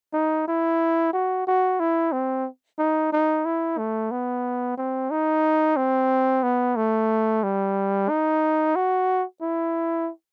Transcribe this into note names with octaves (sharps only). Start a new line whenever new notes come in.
D#4
E4
F#4
F#4
E4
C4
D#4
D#4
E4
A3
B3
C4
D#4
C4
B3
A3
G3
D#4
F#4
E4